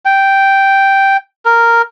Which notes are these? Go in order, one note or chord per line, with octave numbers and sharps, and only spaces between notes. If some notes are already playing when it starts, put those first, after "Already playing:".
G5
A#4